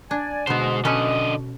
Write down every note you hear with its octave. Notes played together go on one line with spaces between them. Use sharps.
D4 D5 G#5
B2 D3 G#3 B3 C5
D3 C#4 A4 B4 D#5